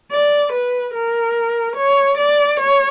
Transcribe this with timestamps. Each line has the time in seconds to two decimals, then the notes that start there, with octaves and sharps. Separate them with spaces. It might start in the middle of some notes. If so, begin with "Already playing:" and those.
0.11 D5
0.52 B4
0.94 A#4
1.76 C#5
2.17 D5
2.59 C#5